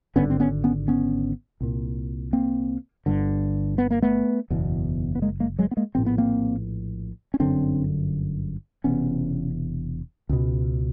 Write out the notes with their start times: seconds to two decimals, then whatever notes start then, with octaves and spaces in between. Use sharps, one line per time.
0.16 G#1 G2 D3 B3 C#4
0.30 C4
0.40 B3 C#4
0.64 B3 C#4
0.88 B3 C#4
1.61 C2 A#2
2.33 A#3 C4
3.06 G1 G2 D3
3.78 B3
3.91 A#3
4.02 A3 B3
4.50 F#1 E2 B2
5.15 B3
5.22 G#3 A#3
5.40 G#3 A#3
5.59 F#3 G#3
5.71 B3
5.77 G#3 A#3
5.95 A#1 A2 C4
6.06 B3
6.18 A#3 C4
7.34 C#4
7.40 G1 F#2 D3 C4 D4
8.84 E1 E2 C3 B3 C#4
10.29 C#2 B2